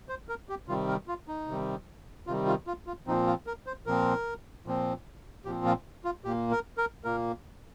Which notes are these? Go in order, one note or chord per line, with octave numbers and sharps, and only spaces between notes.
C5
A#4
G4
C3 D#3 G3 F4
A#4
F4
D#4
C3 D#3 G3
C3 D#3 G3 F4
F4
F4
F4
A#2 F3 C4 D#4
F4
A#4
C5
A#2 F3 C4 A#4
A#2 F3 C4
A#2 F3 C4 G4
F4
F4
A#2 A#3 G4
A#4
A#4
A#2 A#3 A#4